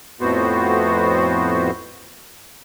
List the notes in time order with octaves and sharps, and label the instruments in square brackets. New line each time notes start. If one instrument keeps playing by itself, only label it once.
[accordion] F2 A2 B3 F#4 C5